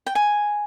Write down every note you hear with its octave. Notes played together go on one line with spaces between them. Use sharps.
G5
G#5